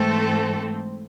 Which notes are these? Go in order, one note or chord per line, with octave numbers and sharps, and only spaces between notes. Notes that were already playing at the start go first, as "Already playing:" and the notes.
Already playing: G#2 E3 A3 C4 A4